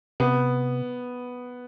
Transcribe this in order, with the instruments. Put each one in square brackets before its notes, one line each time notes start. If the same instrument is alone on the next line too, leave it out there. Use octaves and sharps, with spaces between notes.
[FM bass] C3 [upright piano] B3